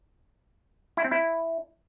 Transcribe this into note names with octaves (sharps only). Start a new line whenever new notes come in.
E4
C4
E4